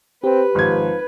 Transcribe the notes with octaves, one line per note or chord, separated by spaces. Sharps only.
C4 G4 B4
G#1 F3 G#6